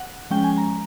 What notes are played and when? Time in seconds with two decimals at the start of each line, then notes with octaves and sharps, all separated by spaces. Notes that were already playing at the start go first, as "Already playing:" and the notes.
Already playing: F#5
0.30 F3 G#3 C#4 G5
0.44 G#5
0.58 A#5